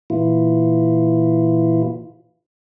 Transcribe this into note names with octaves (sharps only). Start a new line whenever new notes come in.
A#2 E3 E4 F4